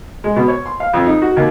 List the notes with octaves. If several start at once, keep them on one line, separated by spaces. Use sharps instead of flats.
G#3
B2
C#5
C6
F5
F2
D#4
F#4
D#2